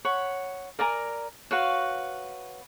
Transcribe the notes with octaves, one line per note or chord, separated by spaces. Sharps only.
C#5 F#5 B5
A#4 D5 G#5 A#5
F#4 B4 C#5 F5